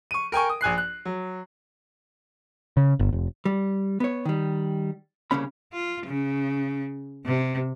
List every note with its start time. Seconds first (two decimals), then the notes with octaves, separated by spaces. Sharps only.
0.11 C#6 D#7
0.32 A#4 G5 G#5 C#6
0.49 D#6
0.61 A#1 G#5 F#6 C7
0.78 F#6
1.05 F#3
2.77 C#3
2.99 G1
3.13 F1
3.45 G3
4.00 B3 C#5
4.25 D#3 G3
5.31 C2 C#3 A#3 C#4 B5
5.73 F4
6.06 C#3
7.25 C3